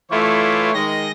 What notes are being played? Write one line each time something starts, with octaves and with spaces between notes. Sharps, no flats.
E3 A3 E4 F4 C#5 D6
D#3 G#3 D#5 A#6